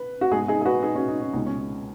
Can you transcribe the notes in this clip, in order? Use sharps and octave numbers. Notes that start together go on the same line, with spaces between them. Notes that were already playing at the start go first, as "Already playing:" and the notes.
Already playing: B4
F#4
G#2 G#3 B3 D#4 G#4
D#4 G#4
G#4
F#4 B4
D#4 G#4
C#4 F#4
D#4
C#4
C#2 B2 G#3 D#4
C#4
C#4